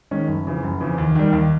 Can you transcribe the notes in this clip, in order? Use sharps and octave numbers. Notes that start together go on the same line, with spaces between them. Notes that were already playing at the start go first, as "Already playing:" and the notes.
D#3 G#3 C#4
F#1
F2 C#3 E3
F#1
F2 C#3 E3
D#2
D#3 G3
D#2